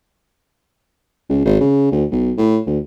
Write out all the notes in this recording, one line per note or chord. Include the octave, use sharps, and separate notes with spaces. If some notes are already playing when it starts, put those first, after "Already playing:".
C#2
G#1
C#3
D2
B1
A2
D2